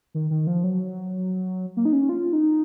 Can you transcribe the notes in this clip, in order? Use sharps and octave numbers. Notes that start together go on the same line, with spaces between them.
D#3
D#3
F3
F#3
A#3
D#4
C#4
F4
D#4